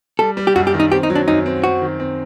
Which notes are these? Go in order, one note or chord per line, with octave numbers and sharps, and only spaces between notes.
G3 A4
G3
G4
F#2 F#4
G4
D#3
D#4
C4 G4
D#4
F#3
D4
F#2 D#4
C4
C4 F#4
D#3
C4